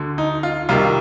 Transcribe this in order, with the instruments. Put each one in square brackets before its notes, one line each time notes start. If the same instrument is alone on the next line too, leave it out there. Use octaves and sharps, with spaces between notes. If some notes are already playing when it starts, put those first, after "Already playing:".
Already playing: [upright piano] D2 D3
D#4
F4
C2 C3 D#3 F4